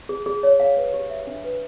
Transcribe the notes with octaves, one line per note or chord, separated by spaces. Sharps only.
G#4
G#4
C#5
F5
B4
G4
E5
D4
B4